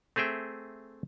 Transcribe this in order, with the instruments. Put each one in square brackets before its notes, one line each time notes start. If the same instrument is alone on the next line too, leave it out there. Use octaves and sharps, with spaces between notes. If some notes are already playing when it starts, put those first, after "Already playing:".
[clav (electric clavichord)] A3 C4 G#4 E5 G5